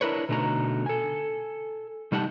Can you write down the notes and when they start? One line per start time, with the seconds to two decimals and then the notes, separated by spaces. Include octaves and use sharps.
0.01 D4 E4 A#4 B4 C#5
0.29 B2 D3 A3 D#4 F#4 A#5
0.86 A4 G#5
2.12 C3 G3 D#4 G4 F#5 A5